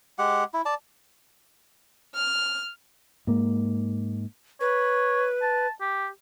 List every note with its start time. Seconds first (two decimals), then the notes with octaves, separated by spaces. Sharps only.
0.18 G#3 G4 F#5
0.54 E4
0.66 D5 A5
2.14 F6
3.27 G#2 A#3
4.61 B4 C#5
5.42 A5
5.81 G4